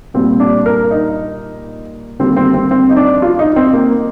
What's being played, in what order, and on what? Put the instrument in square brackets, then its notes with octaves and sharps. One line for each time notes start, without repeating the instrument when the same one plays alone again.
[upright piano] A#2 G3 A#3 C4
D4
A#4
D#4
D#2 D3 G3 C4
C4
C4
C4
D#4
D4
F4
D#4
C4
A#3